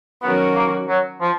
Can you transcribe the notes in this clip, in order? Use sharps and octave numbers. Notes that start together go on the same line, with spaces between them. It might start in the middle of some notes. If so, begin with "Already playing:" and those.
D#3 F#3 B3 C#4 F#4 A#4
A#3
F#3
F3